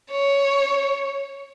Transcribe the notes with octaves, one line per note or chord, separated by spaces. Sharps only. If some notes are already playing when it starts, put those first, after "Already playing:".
C#5